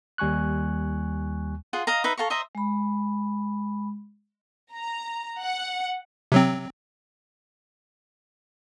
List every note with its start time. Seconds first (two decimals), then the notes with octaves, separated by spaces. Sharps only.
0.18 D#2 G3 G#5 C#6 F#6
1.73 F4 G#4 F#5
1.87 D#5 F5 A#5
2.04 D#4 B4 E5
2.17 A4 F5 A#5 C#6
2.30 C5 D#5 E5 A#5
2.55 G#3 B5
4.75 A#5
5.41 F#5
6.32 C3 F#3 C4